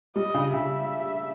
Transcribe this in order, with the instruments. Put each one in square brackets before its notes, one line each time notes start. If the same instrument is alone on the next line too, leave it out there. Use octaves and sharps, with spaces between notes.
[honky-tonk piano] G3 [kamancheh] D#5
[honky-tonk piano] C#3
[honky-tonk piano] C#3 [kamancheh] E5